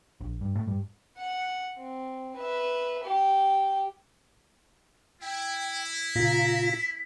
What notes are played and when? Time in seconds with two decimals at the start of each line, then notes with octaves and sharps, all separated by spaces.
0.21 A#1
0.41 G2
0.56 A2
0.68 G2
1.18 F#5
1.78 C4
2.36 B4 E5
3.04 G4 G5
5.21 E4 G5
6.16 A#2 C#3 F4 A#5 B6